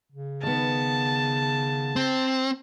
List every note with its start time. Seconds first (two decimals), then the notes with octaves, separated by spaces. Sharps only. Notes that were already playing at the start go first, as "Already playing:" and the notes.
0.12 C#3
0.43 D#3 B3 A5
1.96 C4